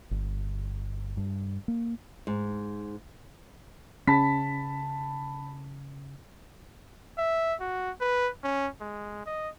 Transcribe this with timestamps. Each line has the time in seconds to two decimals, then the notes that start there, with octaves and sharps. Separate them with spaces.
0.11 G1
1.17 G2
1.68 A#3
2.27 G#2
4.07 C#3 C#4 A5 B5 B6
7.18 E5
7.61 F#4
8.01 B4
8.44 C#4
8.81 G#3
9.26 D#5